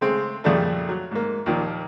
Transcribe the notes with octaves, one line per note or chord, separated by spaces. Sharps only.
C#3 G#3 A3 C4
F2 A#2 C#3 G3 A3
F#3
G#2 A#3
D#2 A#2 D#3 F3